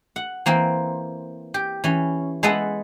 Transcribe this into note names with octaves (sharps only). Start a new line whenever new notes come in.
F#5
E3 A#3 C4
G4
E3 C#4
G#3 B3 A4 B4 E5 F#5